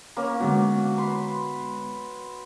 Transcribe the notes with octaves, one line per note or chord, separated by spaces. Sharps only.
A#3 C#4
D3 G#3 B3 F#4
B4 C6